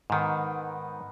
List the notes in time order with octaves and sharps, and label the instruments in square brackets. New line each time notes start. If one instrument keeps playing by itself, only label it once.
[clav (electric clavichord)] G#2 D#3 [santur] B3 D#4 C6